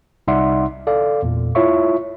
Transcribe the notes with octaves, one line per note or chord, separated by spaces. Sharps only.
C2 D#4 D5 E5 F#5 C6
A4 D5 F5
E2 A#2
E4 F4 C#5 E5 C#6